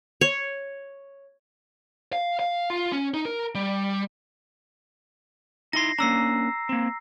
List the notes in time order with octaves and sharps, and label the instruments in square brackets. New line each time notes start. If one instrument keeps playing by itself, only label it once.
[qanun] C#5
[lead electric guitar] F5
F5
F4
C#4
D#4
A#4
G3
[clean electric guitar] D#4 E4 C6 [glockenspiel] A#6 C7
[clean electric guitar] A#3 C#4 D4 [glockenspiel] A#5 E6 C7
[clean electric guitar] A#3 C4